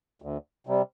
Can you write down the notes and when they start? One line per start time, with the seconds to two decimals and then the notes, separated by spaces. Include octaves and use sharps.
0.22 D2
0.67 C3 G3